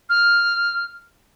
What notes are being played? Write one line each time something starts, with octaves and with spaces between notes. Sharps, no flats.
F6